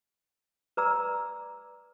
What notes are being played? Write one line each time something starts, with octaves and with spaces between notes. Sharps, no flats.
B4 D5 A#5 D6 E6